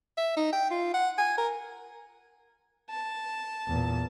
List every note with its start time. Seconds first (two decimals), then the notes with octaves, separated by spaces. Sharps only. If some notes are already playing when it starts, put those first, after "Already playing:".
0.17 E5
0.36 D#4
0.53 G5
0.71 F4
0.94 F#5
1.18 G#5
1.38 A#4
2.90 A5
3.68 E2 A#2